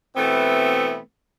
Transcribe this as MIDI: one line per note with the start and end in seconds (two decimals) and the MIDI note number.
0.16 0.99 47
0.16 0.99 52
0.16 0.99 57
0.16 0.99 59
0.16 0.99 60